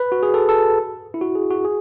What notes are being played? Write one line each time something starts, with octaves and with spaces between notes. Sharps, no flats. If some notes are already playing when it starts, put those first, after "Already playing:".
Already playing: B4
F#4
G#4
A4
A4
E4
F#4
G#4
F#4
G#4